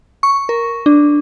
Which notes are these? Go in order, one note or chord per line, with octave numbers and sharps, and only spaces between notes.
C#6
A#4
D4